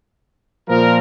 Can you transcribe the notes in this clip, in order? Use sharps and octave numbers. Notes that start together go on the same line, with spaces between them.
A#2 F3 A#4